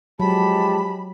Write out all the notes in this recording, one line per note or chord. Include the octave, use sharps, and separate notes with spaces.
F3 F#3 G#3 G4 A5 B5